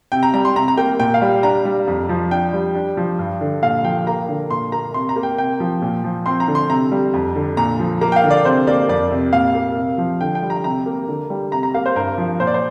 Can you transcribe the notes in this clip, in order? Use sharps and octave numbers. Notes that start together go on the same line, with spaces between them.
C3 G5
A#5
G3 A#5
C6
C3 A#5
A#5
A#3 G5
A#2 G5
F5
G3
D4 A#5
G3
F2
F3
D4 G5
G3
D4
F3
G2
D3
A#2 F5
F3 G5
A#3 A#5
D3
A#2 C6
A#3 A#5
C3 C6
A#5
A#3
G5
C3 G5
F3
A#2
F3
C4 C6
A#5
D3
C6
C3 A#5
G3
F2
D3
A#2 A#5
F3
A#3 A#5
G5
F5
D3
D5
C3 C5
A#3 D5
F2 D5
C3
A#2 F5
A#3
C3
F3
D3 G5
G5
G3
A#5
C3 A#5
A#3
D3
G3
C3 A#5
A#5
A#3 F5
C5
G2 A#4
F3
A#2 C5
D5
C5